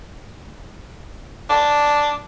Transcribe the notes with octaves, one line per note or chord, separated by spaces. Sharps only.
D4